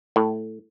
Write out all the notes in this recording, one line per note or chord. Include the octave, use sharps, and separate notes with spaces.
A2